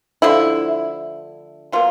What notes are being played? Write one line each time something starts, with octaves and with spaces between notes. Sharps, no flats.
D3 F3 A3 E4
B2 F#3 A#3 F4